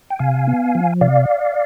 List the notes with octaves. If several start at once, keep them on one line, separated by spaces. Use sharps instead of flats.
G5
C3 F5 G#5
B3
F3
C3 D5 F5